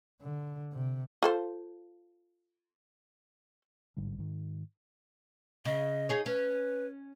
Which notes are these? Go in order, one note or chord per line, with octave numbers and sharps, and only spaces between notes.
D3
C3
F4 A4 C5
A1 G#2 D3 G3
G#2 D#3
C#3 D#5
D#4 G#4 C#5
C#4 B4